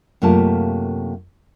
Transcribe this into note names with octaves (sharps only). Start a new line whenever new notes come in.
F#2 C3 A3 A#3 F4 A5